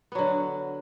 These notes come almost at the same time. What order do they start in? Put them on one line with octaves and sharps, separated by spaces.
B3 F#3 D3